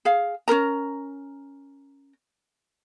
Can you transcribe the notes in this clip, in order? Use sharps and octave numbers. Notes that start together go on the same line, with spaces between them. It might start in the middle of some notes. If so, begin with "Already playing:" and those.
G#4 F5
C#4 G#4 A#4 A#5